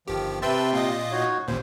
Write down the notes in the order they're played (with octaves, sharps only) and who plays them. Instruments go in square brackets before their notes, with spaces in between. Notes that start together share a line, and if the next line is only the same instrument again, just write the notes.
[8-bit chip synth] G1 G4 [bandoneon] D#3 F3
[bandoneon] C3 G5 C6 [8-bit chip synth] B4 E5 A5
[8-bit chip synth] A#2 F4 D#5
[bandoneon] D#4 F#4 C#5
[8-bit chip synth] A1 D#2 A#2 [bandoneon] C5